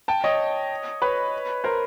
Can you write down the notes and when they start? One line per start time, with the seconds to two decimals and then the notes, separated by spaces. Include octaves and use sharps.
0.08 G5 A5
0.24 C#5 D#5
1.02 B4 C#5
1.64 A#4 C5